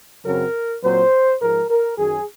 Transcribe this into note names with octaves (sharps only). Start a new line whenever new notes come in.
F#2 C#3 F#3 C4 A#4
A#2 F#3 C4 C5
G#2 F3 G#3 A#4
A#4
F#2 D#3 F#3 G#4